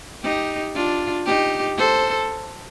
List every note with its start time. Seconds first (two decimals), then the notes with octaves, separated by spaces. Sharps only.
0.23 D#4 G4
0.75 D4 F4
1.26 D#4 G4
1.78 A4 C5